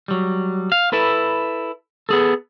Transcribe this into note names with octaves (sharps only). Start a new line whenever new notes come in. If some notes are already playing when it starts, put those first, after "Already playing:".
F#3 G3
F5
E4 A4 B4
B3 G#4 A4